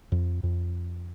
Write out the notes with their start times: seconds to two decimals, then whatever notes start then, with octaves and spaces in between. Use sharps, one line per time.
0.12 F2
0.43 F2